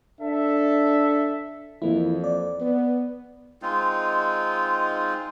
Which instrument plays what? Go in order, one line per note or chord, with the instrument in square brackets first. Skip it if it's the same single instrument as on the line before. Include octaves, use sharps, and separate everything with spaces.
[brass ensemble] D4 A4 E5
[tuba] F2 [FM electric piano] E3 A#3 E4
[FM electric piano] D5
[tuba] B3
[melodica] G#3 C4 D#4 F4